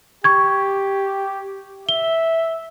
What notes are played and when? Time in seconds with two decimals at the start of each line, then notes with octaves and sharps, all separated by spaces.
0.24 G4 C#6 G#6
1.89 E5 G7